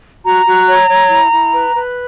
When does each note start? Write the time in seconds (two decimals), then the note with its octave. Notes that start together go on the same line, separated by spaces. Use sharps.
0.24 F#4 A#5
0.46 F#4
0.67 C#5
0.89 C#5
1.10 E4
1.32 E4
1.53 B4
1.75 B4